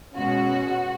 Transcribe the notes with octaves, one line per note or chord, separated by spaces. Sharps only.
B2 G#3 C#4 F#4